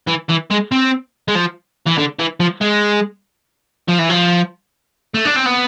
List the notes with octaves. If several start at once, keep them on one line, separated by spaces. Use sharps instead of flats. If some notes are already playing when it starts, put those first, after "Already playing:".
E3
E3
G#3
C4
G#3
F3
E3
D3
E3
F3
G#3
F3
E3
F3
A3
D4
C4
B3